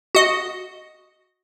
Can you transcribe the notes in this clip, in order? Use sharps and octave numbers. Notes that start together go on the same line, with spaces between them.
F#4 D#5